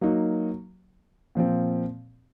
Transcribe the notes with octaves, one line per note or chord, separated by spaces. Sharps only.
F#3 A#3 D#4 F#4
A#2 F3 C4